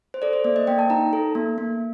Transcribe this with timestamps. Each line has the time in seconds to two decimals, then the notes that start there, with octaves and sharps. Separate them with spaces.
0.14 C5
0.22 A4 D5
0.33 C5
0.44 A#3 D5
0.56 D#5
0.67 A#3 G5
0.79 A5
0.90 D#4 A#5
1.13 A4
1.35 A#3
1.58 A#3